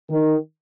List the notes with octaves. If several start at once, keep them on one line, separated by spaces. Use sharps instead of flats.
D#3